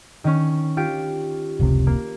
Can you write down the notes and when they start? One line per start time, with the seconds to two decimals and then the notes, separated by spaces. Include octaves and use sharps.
0.24 D#3 C#4
0.77 F4 G4 D7
1.60 F1 C#2 C3
1.87 A#3